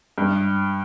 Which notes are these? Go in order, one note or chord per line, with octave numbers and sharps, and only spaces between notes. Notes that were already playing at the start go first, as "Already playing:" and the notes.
G2